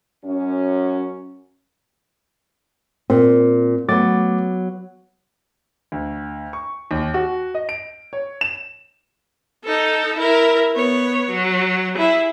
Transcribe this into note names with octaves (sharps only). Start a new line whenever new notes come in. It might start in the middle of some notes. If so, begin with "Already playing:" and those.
F#2 C#4
A#2 C4
F#3 A3 B3 D6 A6
D2
C#6
D#2
F#4
D#5
D7
C#5
E7
D#4 A4
E4 A#4
B3 C#5
F#3
E4 G#4